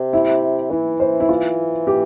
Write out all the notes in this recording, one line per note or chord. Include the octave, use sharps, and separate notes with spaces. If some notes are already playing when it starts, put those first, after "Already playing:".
Already playing: C3
E4
E3 E4
C5
E4
F4
G4